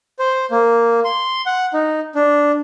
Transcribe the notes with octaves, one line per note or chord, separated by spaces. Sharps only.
C5
A#3
C6
F#5
D#4
D4